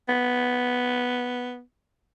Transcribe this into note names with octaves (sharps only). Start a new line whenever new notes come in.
B3